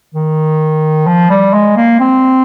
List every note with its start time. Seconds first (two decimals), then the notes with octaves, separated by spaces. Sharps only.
0.15 D#3
1.07 F3
1.30 G3
1.53 G#3
1.77 A#3
2.00 C4